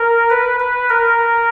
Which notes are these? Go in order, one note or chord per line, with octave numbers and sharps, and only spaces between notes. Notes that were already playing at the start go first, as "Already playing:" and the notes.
Already playing: A#4
B4
B4
A#4